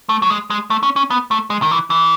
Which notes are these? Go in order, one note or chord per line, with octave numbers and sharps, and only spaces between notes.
A3
F#3
G#3
G#3
A3
C#4
C#4
B3
A3
G#3
D#3
E3
E3